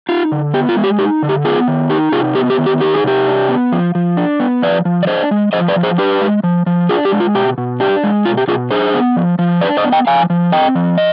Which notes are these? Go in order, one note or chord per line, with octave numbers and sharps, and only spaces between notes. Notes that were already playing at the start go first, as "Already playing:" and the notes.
D#4 F4
D3
B3 G4
F4
G#3
G4
D#4 G4
D3
G4
B3 F4 G#4
D#3
D#4 G4
C3 F4 G#4
B3 G4
G4
D#3
G4
D#4 G4
G#4
C3 G4
D4
B3
F3
F3
D4
B3
F3 B4 D5
F3
D5
D4 C5 D#5
G#3
F3 C5 D#5
B4 D5
F3
G#4 C5
D4 G4 B4
G#3
F3
F3
D4 F4 G#4
G4
G#3
F4
B2 G4
B2
D4 G4
G#3
B2 F4
G4
B2 F4 G#4
D4 G#4 C5
B3
F3
F3
D4 B4 D5
C5 D#5
B3
D#5 G5
F3 F5 G#5
F3
C4 D#5 G5
F3
D#5